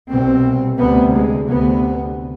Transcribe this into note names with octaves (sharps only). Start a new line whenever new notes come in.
C2 B2 C4
D2 C3 B3
G#3
D2 C3 B3